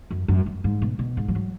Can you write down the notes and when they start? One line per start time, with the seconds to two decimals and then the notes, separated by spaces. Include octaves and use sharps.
0.11 F#2
0.28 F#2
0.46 F#2
0.64 G#2
0.82 B2
0.99 B2
1.17 G#2
1.28 F3
1.35 F#3